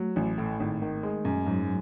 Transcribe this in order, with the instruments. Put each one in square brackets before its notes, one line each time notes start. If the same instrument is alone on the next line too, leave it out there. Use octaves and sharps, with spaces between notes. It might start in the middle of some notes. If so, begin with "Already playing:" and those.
Already playing: [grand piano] F#3 [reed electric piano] A3
[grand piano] A1
A2
G#1
D#3
G#3
F#2
[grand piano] G#2 [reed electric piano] F#3